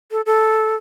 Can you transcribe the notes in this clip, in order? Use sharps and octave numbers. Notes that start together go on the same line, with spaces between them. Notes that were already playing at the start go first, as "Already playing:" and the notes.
A4
A4